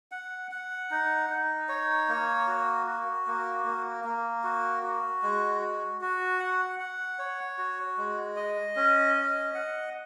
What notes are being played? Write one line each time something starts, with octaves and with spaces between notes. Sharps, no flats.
F#5
F#5
D#4
D#4
C#5
A#3
F#4
F#4
A#3
A#3
A#3
F#4
F#4
G#3
F#4
F#4
F#5
F#5
C#5
F#4
G#3
D#5
C#4
D#5
F#5